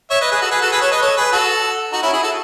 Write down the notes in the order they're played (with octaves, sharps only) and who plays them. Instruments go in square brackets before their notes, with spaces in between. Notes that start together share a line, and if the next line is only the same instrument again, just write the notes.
[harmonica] C#5 E5
B4 D#5
G#4 B4
F#4 A4
G#4 B4
F#4 A4
G#4 B4
A4 C#5
B4 D#5
A4 C#5
G#4 B4
F#4 A4
D#4 F#4
C#4 E4
E4 G#4
F#4 A4